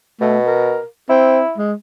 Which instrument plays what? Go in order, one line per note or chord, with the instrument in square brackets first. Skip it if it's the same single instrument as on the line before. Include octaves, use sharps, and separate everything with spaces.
[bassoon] B2 [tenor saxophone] A3
[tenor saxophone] A#4
[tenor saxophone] C4 [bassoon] E4
[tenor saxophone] G#3